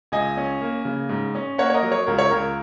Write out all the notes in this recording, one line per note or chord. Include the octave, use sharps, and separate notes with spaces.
C#2 D#5 G#5
C#4
A#3
C#3
G#2
C#4
A#3 C#5 F#5
C#5
A#4 D#5
F#3
C#5
C#2 A#4
C#5
C#2 A#4